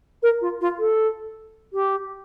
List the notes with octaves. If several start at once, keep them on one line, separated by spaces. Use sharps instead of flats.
A#4
F4
F4
A4
G4